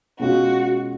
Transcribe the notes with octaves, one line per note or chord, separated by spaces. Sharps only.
B2 G#3 C#4 F4 F#4